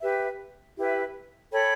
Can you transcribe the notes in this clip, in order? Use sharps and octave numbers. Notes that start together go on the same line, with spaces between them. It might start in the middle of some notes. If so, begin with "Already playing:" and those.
G4 B4 E5
E4 G4 B4 E5
A4 C#5 G5 B5